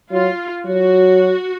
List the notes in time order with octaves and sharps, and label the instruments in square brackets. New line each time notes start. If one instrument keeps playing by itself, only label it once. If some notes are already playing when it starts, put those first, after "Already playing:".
[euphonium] F#3 [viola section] F4
[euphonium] F#3 [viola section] F#4